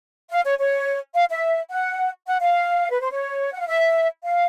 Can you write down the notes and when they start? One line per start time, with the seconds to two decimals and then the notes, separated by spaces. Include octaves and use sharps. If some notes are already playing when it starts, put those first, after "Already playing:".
0.30 F5
0.44 C#5
0.59 C#5
1.15 F5
1.29 E5
1.71 F#5
2.27 F#5
2.41 F5
2.91 B4
3.00 C5
3.11 C#5
3.53 F#5
3.60 F5
3.67 E5
4.23 F5